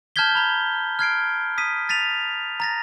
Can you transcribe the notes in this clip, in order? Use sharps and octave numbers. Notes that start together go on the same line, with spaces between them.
A5 F6 G6 G#6 B6 G7
A#5 B5
F6 G#6 C7 D7
D#6 B6 D#7
A6 B6 D#7 F7
A#5 A6 A#6